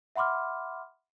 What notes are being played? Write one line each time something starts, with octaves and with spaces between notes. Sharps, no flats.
E5 F#5 B5 C6 D6 F6